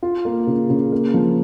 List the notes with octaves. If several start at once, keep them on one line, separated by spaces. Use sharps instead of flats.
F4
A#3
C#3
C#3
A#3
F3